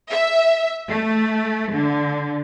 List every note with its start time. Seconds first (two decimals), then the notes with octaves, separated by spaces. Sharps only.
0.11 E5
0.88 A3
1.73 D3